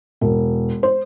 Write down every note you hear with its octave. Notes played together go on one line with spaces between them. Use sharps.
E1
C5